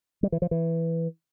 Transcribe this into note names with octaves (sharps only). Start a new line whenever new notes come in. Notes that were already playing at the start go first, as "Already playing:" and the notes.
G3
E3
F3
E3